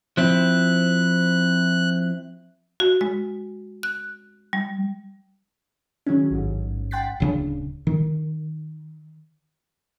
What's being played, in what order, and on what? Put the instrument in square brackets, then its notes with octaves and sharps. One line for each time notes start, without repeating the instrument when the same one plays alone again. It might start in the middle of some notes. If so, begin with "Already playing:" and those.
[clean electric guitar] F3 C4 E4 [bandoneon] F#6
[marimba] F#4
G#3
F#6
G3
[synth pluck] D#3 F#3 G#3 C#4
A1 G#2
F#5 G5 C6 F#6 A6 B6
[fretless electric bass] D1 C#3 D4
D#3